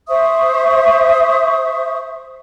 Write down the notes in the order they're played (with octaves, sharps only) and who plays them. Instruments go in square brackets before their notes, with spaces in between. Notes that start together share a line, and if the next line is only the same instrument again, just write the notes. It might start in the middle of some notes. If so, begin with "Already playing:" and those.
[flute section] C5 E5 C#6 D#6